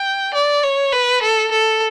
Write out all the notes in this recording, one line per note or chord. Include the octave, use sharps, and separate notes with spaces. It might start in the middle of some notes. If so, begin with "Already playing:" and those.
Already playing: G5
D5
C#5
B4
A4
A4